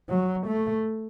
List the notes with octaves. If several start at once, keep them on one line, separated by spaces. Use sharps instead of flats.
F#3
A3